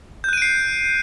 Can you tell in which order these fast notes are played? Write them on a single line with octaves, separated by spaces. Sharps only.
G6 F#6 D#7 D7 C7